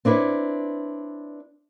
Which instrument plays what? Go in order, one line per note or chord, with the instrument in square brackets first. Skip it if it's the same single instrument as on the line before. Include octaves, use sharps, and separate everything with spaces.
[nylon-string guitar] C4 D4 E4 A#4 B4 C#5